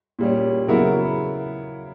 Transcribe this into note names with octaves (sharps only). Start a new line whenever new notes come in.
A#2 G3 C#4
C#3 F#3 B3 E4 A#4